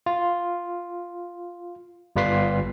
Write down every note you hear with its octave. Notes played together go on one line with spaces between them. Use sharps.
F4
G1 G3 F4 B4 B6 C7